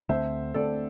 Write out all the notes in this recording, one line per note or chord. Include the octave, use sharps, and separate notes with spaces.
D2 D3 A3 C4 C5 E5
D2 D3 A3 C4 A4 D5